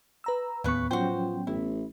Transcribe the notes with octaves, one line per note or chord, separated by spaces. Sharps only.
B4 A#5 E6
D#2 A2 C#3 B3 B4 C#6
F3 F#3 C#4 F#4 C5 G5
A1 E4